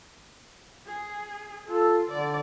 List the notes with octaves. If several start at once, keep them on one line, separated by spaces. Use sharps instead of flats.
G#4
F4 A4
D3 D5